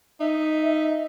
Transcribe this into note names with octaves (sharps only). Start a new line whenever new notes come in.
D#4 E5